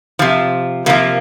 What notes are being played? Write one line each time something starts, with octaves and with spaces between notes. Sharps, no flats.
C3 F3
C3 F3 A#3